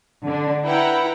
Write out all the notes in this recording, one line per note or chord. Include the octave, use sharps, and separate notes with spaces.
D3 D4
E4 B4 F#5 G5 A#5